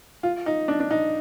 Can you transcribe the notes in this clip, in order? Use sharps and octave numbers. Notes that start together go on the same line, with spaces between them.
F4
D#4
D4
D4
D#4